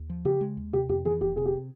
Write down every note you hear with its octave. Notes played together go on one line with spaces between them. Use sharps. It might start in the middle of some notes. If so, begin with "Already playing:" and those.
Already playing: D#2
F3
C#3 G4
G#3
D#2
C3 G4
F2 G4
E3 G#4
F1 G4
C3 G#4
G4